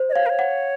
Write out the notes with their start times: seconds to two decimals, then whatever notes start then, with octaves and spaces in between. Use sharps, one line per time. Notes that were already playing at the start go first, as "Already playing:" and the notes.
Already playing: C5
0.09 D#5
0.12 C#5 F5
0.26 A#4
0.29 C#5
0.39 F#5